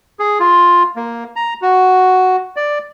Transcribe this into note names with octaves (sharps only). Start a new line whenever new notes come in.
G#4
F4
A#3
A#5
F#4
D5